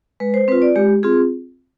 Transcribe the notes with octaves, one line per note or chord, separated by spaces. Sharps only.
G#3 B4
C5
C4 F4 B4
D5
G#3 G4
C4 F4 G#4